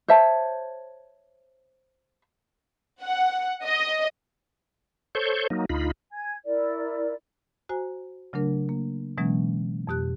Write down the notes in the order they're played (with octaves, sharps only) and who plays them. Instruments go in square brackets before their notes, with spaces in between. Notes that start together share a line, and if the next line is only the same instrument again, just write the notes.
[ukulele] C5 C#5 E5 A5
[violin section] F#5
D#5
[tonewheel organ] A4 C5 C#5 C#6 G6
F#3 A#3 D#4
D2 D#4 F4 B5
[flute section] G#5 G#6
E4 A#4 D5
[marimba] F#4 C5 G#5 A#5
C#3 F#3 A3 D4 A#4
A#3
B2 E3 F#3 G#3 A#3 C#4
F2 B2 G4 F#6